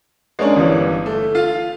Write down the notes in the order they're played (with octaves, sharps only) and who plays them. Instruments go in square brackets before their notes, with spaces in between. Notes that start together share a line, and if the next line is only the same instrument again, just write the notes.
[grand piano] G#3 A#3 C#4 D4
G1 E3
A3
F4 F5